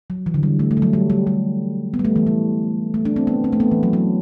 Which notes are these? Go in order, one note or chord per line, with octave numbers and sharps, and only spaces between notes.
F#3
E3
D3
G3
A3
A3
G3
F#3
G3
G3
G3
B3
G3
A3
E3
G3
A3
D4
C4
B3
C4
A3
B3
E3
F#3
F#3